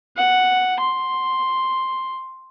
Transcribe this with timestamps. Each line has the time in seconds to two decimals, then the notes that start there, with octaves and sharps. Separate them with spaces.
0.17 F#5
0.81 C6